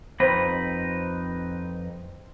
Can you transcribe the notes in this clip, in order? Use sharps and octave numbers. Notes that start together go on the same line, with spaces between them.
F2 C4 D#4 B4